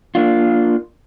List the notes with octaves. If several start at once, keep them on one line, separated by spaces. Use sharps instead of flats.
A#3 D4 F4